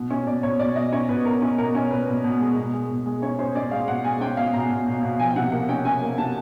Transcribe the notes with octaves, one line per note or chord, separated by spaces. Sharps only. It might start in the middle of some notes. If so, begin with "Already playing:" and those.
Already playing: B2
C#4
B2 D5
B2 C#5
B2 D5
B2 D#5
C#4 C#5
B2 B4
B2 A#4
C#4
B2 A#4
C#4
B2 B4
B2
B2
G#3
B2
G#3
B2
G#3
C#4 C#5
C#4 C5
C#4 D5
G#3 F5
B2 F#5
G#3 G#5
C#4 G5
B2 F5
B2 A#5
B2
B2
B2
F3 G#5
G5
C3 F#5
A#3 F#5
C#4 G5
C#4 G#5
A#3
C3 A5